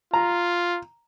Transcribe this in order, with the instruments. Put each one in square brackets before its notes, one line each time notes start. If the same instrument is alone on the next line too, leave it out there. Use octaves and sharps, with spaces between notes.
[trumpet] F4 [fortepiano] A#5